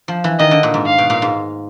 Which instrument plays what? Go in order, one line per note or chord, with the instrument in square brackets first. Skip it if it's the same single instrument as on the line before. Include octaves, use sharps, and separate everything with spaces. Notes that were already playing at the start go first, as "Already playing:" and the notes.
[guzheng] F3
E3
[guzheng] D#3 [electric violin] D#5
[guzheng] D3
A#2
G#2
[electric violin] F5
[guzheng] B2
A#2
G#2